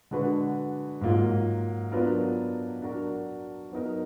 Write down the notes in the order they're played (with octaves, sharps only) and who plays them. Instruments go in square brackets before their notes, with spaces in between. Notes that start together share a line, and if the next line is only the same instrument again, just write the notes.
[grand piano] D3 G#3 D4 F#4 B4
G#2 F#3 A#3 F4
F#3 B3 D4 F4 A#4
F#3 D4 F#4 A#4
F#3 B3 D#4 A#4